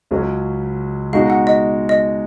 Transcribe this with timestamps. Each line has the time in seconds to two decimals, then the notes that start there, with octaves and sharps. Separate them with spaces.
0.11 C#2 C#3 F#3 C#4
1.13 B2 G#3 D#4 F#4 F5
1.30 F#5
1.47 D#5
1.89 D#5